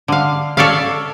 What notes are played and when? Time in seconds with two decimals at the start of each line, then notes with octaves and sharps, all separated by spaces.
0.08 D3 F5
0.57 A4 C#5 D5 E5 F5